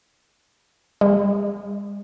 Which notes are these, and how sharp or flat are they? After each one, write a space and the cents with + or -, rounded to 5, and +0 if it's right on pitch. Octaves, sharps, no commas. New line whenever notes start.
G#3 -45